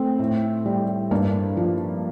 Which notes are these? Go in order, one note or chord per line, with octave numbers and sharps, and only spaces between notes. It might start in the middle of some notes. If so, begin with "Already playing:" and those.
Already playing: A3 C4
A2
G3
G2 A#3 D4
F3